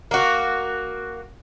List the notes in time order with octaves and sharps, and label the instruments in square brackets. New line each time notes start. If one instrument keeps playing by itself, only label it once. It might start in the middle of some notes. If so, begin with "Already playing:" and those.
[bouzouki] A#3 F#4